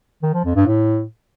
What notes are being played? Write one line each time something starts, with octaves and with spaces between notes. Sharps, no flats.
D#3
F3
F2
G2
A2